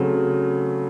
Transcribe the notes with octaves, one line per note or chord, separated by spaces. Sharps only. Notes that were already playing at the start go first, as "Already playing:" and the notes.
Already playing: C#3 F#3 A3 C4